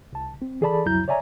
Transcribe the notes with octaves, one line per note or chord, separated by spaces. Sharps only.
C2 A5
C4
E3 G#4 A4 D5 A5 B5
C2 F2 F#3 E4 A#5 G6
C#5 D5 E5 G#5 A#5